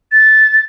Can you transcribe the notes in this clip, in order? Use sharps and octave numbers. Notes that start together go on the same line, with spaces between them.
A6